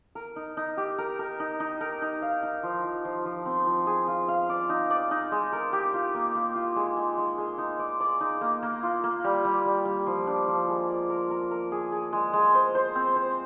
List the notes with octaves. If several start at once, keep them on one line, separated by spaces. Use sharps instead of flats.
A#4
D#4
D#4
G4
A#4
A#4
D#4
D#4
A#4
D#4
F5
D#4
F3
F3
F3
F3
C4
F3
G#4
F4
F5
D5
D#4
D5
D#4
G#3
A#4
G4
F4
A#3
A#3
F4
G#3
G#3
G#3
G#3
D#4
D5
D5
D#4
A#3
A#3
F4
A#3
G3
G3
G3
G3
F3
D4
F3
G#3
D5
A#4
A#4
A#4
G#4
G#4
G#3
G#3
C5
C5
C4
C5